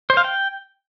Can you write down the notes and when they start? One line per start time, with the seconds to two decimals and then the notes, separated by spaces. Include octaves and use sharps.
0.10 C5
0.17 F5
0.24 G5